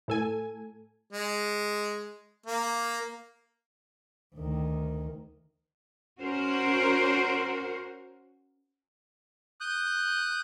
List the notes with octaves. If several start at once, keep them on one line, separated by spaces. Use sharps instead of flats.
A2 A4 G#5
G#3
A#3
D2 D#3
C#4 F#4 A#4 C5
D#6 F#6 G6